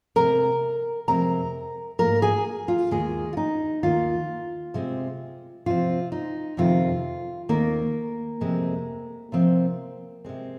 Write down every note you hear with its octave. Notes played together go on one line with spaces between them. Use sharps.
C3 G#3 C4 A#4 A#5
F2 C3 G#3 C4 A#4 A#5
G#2 D#3 A#3 A#4 A#5
G#4 G#5
F4
D#2 D#3 G#3 A#3 G#4
F4
D#4
D#2 D#3 A#3 F4
C3 G#3 C4
C3 F3 C4 F4
D#4
F2 C3 D#3 C4 F4
D#2 D#3 A#3 C4 A#4
F2 C3 G#3 C4
C3 F3 C4
C3 G#3 C4